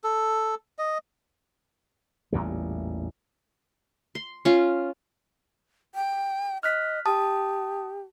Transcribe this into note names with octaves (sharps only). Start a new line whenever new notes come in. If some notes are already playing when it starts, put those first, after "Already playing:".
A4
D#5
A1 E2 A#2 G3
C6
C#4 F4
G5
D#5 F6 F#6 B6
G4 A5 D#6